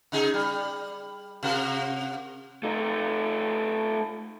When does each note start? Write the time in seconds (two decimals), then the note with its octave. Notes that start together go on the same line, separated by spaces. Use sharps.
0.12 C#3 D#4 G#4
0.34 G3
1.43 C3 F#4 A#4
2.63 A3 D#4